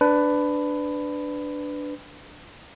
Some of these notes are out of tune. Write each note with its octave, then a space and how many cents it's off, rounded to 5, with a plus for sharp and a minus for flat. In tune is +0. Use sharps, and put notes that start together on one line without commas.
D4 +0 B4 +15